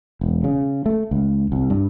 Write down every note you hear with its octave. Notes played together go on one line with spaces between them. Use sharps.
E1
C#3
A3
C#2
C2
G2